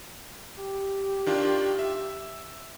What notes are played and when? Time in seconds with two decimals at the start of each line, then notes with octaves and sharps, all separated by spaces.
0.57 G4
1.26 D#3 D4 F4
1.79 E5